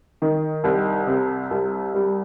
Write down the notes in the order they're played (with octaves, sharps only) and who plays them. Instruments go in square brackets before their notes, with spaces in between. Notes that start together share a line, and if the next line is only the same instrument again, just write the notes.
[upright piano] D#3
C2
C3
C2
G3